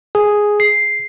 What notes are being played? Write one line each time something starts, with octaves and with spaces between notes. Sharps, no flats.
G#4
C7